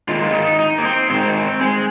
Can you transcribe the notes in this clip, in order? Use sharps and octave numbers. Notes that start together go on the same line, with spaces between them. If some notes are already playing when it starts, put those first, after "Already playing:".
G#2 D#3 F4
F4
D#4
D#4
A#3
C4
G#2 D#3 C4
G#3